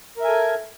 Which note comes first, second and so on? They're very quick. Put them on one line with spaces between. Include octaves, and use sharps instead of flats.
A#4 E5 G#5 A4